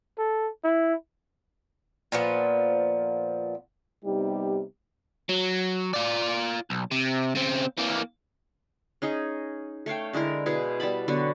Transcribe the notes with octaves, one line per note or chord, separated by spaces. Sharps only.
A4
E4
A#2 F3 B3
C3 G3 B3 D#4 G4
F#3
F4 D5
B1
C3
C#3 C4
E3 A#3
C#4 D#4 G#4 D#5
A3 C#5 F5 G5
D3 G#3 E4 A#4
B2 B3 E4 G#4
G3 B3 A5 B5
D3 F#3 B3 F#4